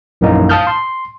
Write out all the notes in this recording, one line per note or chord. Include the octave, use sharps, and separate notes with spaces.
A#1 F#2 E3 A#3 D#4
F5 A5 D#6 F6 G6
C6